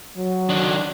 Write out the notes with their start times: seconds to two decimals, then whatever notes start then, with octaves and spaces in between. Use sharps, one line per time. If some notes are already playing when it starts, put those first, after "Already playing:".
0.17 F#3
0.49 D#3 D4